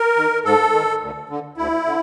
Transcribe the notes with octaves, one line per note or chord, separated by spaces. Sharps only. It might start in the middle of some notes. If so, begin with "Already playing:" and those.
Already playing: A#4
D#3
G#2 A4
D#3
D2
D3
D2 E4
D3